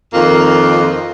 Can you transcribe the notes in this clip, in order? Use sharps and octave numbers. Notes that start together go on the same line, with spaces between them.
F2 D#3 A#3